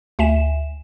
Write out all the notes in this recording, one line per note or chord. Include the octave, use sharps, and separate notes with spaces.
D2 E5 G#5 E7